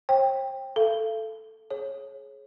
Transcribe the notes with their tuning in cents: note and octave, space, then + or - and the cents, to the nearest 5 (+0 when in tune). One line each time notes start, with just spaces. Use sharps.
C5 +45 G5 +5
A4 +0 F5 -45
G#4 +25 C#5 -20